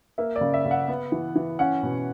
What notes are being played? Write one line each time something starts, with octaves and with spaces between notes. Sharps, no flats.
A#3 E5
D5
C#3
E5
C#3
F#5
B3
E3
E3
C#4 F#5
B2